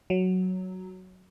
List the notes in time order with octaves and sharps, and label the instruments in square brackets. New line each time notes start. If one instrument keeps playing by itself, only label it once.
[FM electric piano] F#3